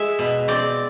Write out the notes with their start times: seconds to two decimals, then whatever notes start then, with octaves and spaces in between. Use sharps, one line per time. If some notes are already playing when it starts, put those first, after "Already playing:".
Already playing: G#3 E5
0.19 B2
0.48 C4 D5